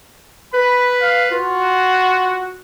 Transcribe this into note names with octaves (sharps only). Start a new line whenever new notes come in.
B4 B5
F5
F4 F#4